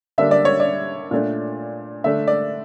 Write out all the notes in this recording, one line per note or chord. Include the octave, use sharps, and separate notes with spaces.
D3 G3 A#3 D4 E5
D5
C#5
D5
A#2 A3 D4
D3 A3 D4 E5
D5